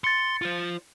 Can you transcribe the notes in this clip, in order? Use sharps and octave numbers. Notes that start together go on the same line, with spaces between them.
C6 A6 C#7
F4 C5